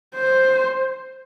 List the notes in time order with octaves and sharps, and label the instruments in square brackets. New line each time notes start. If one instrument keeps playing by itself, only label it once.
[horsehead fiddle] C5